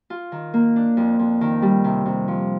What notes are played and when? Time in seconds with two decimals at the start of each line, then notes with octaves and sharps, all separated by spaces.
0.10 F4
0.32 D#3
0.54 A#3
0.76 D4
0.97 F2
1.19 F2
1.41 D#3
1.62 G3
1.84 C3
2.06 C3
2.28 F3